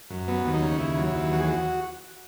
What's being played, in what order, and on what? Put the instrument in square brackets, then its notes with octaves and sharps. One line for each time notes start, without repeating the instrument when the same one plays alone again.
[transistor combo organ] F#2
F#3 B3
D#2
D#4
C#3
D#2 E4
F#3
E4
D#2
E3 F#4
G#4
F#4